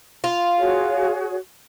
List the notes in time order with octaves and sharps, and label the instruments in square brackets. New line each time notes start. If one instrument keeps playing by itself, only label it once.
[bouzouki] F4
[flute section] F#4 G#4 C#5